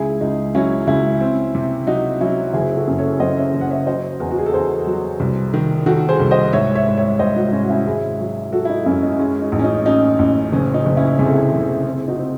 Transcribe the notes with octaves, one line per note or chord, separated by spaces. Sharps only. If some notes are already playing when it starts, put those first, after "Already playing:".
Already playing: C#2 E4 G#4
C#2 D#4
F#3 C#4 E4
C#2 C#4 E4
C4
C3
F#3 D#4 F#4
F#3 C#4 E4
F#1 E4 G#4
F#4 A4
F#2
A4 C#5
F#2 C5 D#5
C#5 E5
F#1
F#5
C#5 E5
F#3 C5 D#5
E2
F#4
G#4
A4
E2 G#4 C5
F#3
C2
D#3
D#3 F#4 A4
G#4 C5
C2
C5 D#5
G#2 C#5 E5
C#5 E5
G#2
C#5 E5
G#2 C5 D#5
D#4 F#4
F#4
G#2 C#4 E4
F#4
C#4 E4
G#1 E4 G#4
F#3
F#3 F#4 A4
E4
D#4 F#4
F#2 C#4 E4
D#4
G#3 C#4
D#4
A1
C#4
D#4
C#4 D#4
A1
F#1 C#4
D#4
F#1
C#4 E4
C3 G#4
A4
E4 G#4
F#1
C4
D#4 F#4
C4